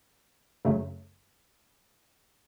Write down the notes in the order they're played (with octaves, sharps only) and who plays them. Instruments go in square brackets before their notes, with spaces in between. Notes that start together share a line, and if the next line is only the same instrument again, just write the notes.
[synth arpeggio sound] F#2 C#3 F#3 A3